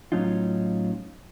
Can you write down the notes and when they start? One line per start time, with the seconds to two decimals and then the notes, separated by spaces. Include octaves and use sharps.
0.12 A2 F#3 C#4 D#4 F4